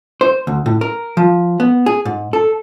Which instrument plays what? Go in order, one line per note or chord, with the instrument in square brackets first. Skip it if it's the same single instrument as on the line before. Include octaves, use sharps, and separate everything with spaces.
[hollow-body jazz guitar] C5
D2
A2
A#4
F3
B3
G#4
G#2
A4